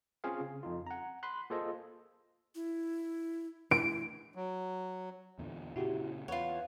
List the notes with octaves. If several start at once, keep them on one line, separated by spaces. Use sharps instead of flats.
C4 C#4 F4 G#4 C#5 F5
C#3
F2 D#4 F4
F#5 A#5
B5 C6 F#6
A#3 F4 G#4 A4 C5 D#5
E4
E4 D7
F#3
E2 A#2 D3
A#2 C#3 E4 F#4 G4
E2 F4 B4 C#5 F#5